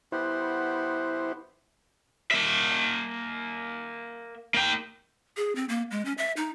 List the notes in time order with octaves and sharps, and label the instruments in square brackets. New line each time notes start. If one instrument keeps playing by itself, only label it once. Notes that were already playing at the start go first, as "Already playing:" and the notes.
[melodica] B3 G4 F#5 [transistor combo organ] E4 C5
[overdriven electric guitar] A#3 E5
A#3 G5
[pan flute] G#4
C4
A#3
G#3
C#4
E5
D#4